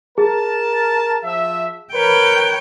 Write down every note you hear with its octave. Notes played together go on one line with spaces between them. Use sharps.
G#4 A#4 A5
F3 E5
A#4 B4 C#5 G5